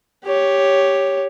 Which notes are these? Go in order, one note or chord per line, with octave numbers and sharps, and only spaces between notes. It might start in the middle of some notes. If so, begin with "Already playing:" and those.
G4 C#5